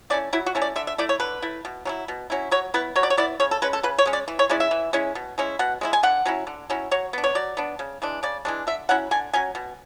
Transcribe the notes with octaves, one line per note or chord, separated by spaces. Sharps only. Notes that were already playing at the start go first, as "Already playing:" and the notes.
A3 C#4 E4 D5
F#3 E4
F#4
A3 C#4 E4
D5
D3 E5
E5
A3 E4 D5
C#5
D3 B4
A3 E4
B2
F#3 C#4 E4
B2
F#3 C#4 E4
F#3 C#5
B3 E4 B4
F#3 C#5
D5
C#5
B3 E4 D5
C#3 C#5
A4
G#3 C#4 B4
A4
C#3 B4
C#5
G#3 C#4
D5
E3
C#5
G#3 C#4 E4 D5
E5
E3
G#3 C#4 E4
B2
G#3 C#4 E4
B2 F#5
G#3 C#4 E4
G#5
D3 F#5
F#3 C#4 E4
D3
F#3 C#4 E4
F#3 C#5
B3 D4
C#5
F#3 D5
B3 D4
C#3
E3 G#3 D4
C#3 D5
E3 G#3 D4
D3 E5
F#3 C#4 E4 F#5
D3 G#5
F#3 C#4 G#5
B2